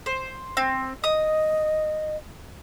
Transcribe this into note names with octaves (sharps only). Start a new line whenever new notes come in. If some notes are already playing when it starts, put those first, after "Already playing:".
C5
C4
D#5 D#6